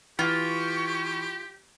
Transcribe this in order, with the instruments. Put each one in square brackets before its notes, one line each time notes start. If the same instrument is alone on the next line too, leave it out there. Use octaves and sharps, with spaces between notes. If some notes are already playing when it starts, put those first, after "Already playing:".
[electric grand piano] E3 [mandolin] F4 [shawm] G4 [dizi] C#6